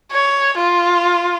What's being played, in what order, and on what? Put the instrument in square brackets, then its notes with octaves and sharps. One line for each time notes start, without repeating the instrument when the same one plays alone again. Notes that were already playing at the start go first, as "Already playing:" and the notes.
[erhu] C#5
F4